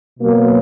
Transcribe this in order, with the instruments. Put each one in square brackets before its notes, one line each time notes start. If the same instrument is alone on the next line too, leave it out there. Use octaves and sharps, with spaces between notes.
[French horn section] B2 F#3 A#3